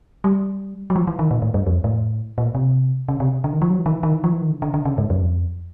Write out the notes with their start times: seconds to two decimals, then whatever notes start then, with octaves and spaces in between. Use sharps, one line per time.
0.24 G3
0.90 F#3
0.96 F3
1.07 E3
1.19 D#3
1.31 A#2
1.42 A2
1.54 G2
1.67 F2
1.84 A2
2.38 A#2
2.55 C3
3.08 C#3
3.20 C3
3.44 D3
3.53 D#3
3.62 F3
3.70 F#3
3.79 E3
3.86 D#3
3.91 E3
4.03 D#3
4.15 E3
4.24 F3
4.33 E3
4.41 D#3
4.50 D3
4.62 D3
4.74 D3
4.85 C#3
4.98 G#2
5.10 F#2
5.21 F2